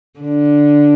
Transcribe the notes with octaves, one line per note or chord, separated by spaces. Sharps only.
D3